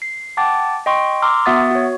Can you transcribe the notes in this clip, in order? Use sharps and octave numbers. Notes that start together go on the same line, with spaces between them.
C7
F#5 G5 A5 D6 A6
D#5 G5 C6 C#6
A#5 C6 D6 E6 F6
B3 F#4 E5 F#5 D#6 A6
F#4 C#5